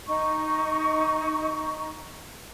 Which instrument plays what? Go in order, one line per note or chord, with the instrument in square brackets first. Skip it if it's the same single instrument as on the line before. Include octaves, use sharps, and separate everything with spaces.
[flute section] D#4 C#6